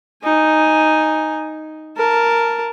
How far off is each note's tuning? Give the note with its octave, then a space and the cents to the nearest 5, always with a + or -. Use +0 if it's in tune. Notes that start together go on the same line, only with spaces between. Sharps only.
D#4 +0 G#5 +0
A#4 +0 A5 +0